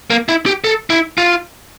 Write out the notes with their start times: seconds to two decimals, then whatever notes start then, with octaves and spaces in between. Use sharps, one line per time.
0.10 A#3
0.29 E4
0.46 G4
0.64 A4
0.90 E4
1.18 F4